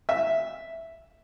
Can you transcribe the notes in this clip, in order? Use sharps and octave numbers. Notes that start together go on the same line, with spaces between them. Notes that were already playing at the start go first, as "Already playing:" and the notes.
E5